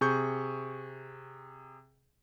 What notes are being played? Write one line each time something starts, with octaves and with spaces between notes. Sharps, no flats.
C3 G#4 C#6 G6